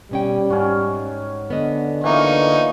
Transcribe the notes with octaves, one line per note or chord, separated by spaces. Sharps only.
B2 G3 C#4 G5
G#2 C#4 F#4
D3 B3 D#5
D3 E3 A#3 D#4 F4 C#6